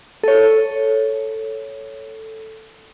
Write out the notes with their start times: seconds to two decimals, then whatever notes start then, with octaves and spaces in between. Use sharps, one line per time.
0.23 A4 C#5